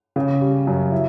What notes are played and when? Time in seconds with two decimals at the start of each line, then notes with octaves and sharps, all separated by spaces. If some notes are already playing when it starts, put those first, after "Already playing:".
0.16 C#3
0.41 G3
0.67 F#2
0.92 E4